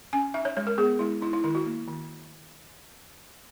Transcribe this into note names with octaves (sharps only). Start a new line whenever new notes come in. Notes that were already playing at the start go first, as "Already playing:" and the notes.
C#4 G#5
D#4 E5
C#5
G#3 C#5
A#4
B3 G#4
G#3 E4
D#4 E4
E4
D#3 E4
F#4
A#3
D#3